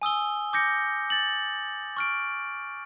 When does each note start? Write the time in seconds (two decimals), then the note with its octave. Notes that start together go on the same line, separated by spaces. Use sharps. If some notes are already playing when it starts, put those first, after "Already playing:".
0.02 G#5 D#6 E6 G7
0.53 D6 G6 A#6 C#7
1.10 A6 F#7
1.97 C#6 F6 D7